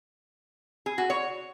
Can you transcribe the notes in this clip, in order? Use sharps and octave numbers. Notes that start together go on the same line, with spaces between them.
G#4
F#4
C#5